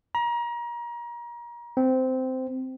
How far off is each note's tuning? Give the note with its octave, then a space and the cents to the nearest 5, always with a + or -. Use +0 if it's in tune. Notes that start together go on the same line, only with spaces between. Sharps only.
A#5 +30
C4 -15